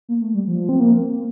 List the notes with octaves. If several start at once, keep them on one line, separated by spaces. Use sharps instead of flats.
A#3
A3
G3
F3
C4
A#3